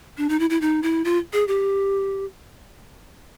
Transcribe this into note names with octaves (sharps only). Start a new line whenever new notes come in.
D4
D#4
E4
E4
D#4
E4
F4
G#4
G4